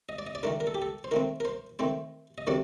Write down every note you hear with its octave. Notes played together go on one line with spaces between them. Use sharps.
D#5
D5
D#5
D5
D#3 A3 D4 A#4
A#4
A4
G4
A4
C5
D#3 A3 C4 A#4
A#4
C5
D#3 A3 C4 C5
D#5
C3 D#3 F#3 A3 D4 D5